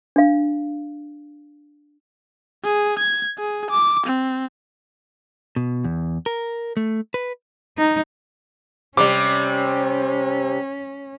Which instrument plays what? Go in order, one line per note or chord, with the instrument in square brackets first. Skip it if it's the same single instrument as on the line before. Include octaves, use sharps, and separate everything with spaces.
[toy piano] D4 F5
[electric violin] G#4
G#6
G#4
D6
C4
[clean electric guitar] B2
E2
A#4
A3
B4
[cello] D#4
[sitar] C3 G3 [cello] C#4 [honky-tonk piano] D6